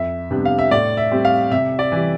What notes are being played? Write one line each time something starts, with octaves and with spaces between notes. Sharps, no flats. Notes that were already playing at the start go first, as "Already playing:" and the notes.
Already playing: F2 E5
C3 G3 B3 D4
F5
E5
A2 D5
E5
G3 C4
F5
C3 E5
D5
E3 G3